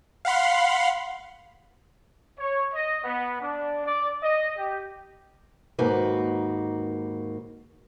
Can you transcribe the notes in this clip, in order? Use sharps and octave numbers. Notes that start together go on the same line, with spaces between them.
F5 F#5 B5 C6
C#5
D#5
B3
D4
D5
D#5
G4
D#2 G#2 A#3 D#4 F#4 B4